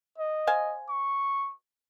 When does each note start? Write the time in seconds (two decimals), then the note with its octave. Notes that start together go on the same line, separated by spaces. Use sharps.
0.18 D#5
0.47 C5 F5 G#5
0.89 C#6